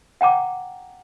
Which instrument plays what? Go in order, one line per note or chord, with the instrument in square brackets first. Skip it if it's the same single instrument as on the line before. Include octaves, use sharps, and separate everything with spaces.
[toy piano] F#5 G5 A#5 D6